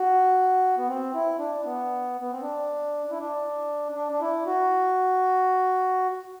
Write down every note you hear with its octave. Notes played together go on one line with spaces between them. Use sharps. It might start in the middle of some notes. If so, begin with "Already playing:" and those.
Already playing: F#4
B3
C4
E4
D4
B3
B3
C4
D4
E4
D4
D4
D4
E4
F#4